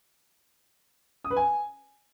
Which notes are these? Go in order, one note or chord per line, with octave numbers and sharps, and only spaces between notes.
D#6
B4
G#5